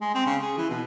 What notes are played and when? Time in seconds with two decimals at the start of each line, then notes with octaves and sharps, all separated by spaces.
0.01 G#3
0.15 C4
0.26 C#3
0.42 G#4
0.58 E3
0.70 B2